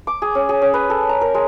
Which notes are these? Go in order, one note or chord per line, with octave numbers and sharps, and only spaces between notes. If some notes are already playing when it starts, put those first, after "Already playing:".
D6
G#4
C#4
G#4
C#4
B4
A4
A#5
A#4
G#3